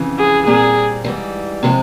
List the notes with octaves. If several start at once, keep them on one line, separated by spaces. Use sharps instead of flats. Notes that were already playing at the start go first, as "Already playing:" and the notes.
Already playing: F2 C#3 E3
G#4
A#2 G3 C4 G#4
G#2 E3 G3
C3 F3 G#3 C4